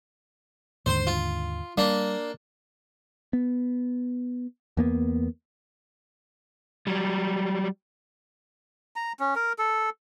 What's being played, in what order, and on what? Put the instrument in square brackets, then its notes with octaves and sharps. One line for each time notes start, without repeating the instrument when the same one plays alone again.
[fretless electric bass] D#2 G#2 D3 [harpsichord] C5 C6
[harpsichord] F4
[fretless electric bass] G3 [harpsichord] A#3 D4
[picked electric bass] B3
E2 A#3 B3
[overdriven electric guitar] F#3 G3
[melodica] A#5
C#4
A#4
A4